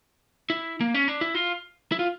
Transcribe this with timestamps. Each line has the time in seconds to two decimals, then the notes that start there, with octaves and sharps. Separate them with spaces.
0.50 E4
0.81 A#3
0.94 C#4
1.08 D4
1.21 E4
1.35 F4
1.92 E4
1.99 F4